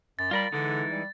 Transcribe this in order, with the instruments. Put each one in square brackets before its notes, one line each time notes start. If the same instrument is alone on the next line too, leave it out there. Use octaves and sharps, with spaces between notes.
[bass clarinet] F#2 [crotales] A6
[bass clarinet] G3 [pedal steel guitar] F4 A#4 B5
[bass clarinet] D3 [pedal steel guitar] E3 G#3 D#4
[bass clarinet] G3